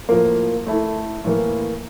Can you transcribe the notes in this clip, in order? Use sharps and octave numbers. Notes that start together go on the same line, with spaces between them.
A2 F3 A#3
A3 E4 A4
A2 E3 A#3